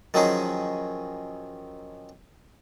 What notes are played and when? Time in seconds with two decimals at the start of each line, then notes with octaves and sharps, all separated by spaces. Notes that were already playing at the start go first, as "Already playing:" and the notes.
0.14 D#3 F3 F#3 C#4 D#4 G#4